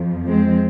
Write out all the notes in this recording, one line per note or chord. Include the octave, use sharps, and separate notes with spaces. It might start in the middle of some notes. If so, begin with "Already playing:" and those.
Already playing: F2 F3
G#3 C4